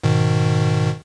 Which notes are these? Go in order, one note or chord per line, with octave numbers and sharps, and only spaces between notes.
G#2 B2 D#3